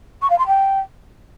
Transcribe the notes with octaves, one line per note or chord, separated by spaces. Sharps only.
C#6
F5
C6
G5